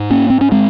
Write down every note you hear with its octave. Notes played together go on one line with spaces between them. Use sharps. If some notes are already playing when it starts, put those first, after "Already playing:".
Already playing: G#2
A#3 C#4
C4
C#4
G#3 C4